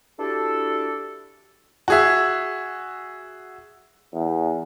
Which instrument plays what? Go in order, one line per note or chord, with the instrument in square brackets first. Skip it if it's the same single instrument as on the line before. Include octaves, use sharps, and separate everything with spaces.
[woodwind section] D4 E4 F#4 G4 A4
[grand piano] F#4 G#4 E5
[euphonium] E2